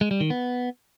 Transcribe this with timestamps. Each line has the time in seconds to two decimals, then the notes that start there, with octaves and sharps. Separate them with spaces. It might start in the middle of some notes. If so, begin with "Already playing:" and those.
0.01 G#3
0.11 G3
0.21 D#3
0.30 B3